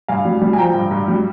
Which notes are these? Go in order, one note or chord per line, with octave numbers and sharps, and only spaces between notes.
G2 F5 G#5
G3
G3
G#5
F3 G5 A#5
G2
G2
G3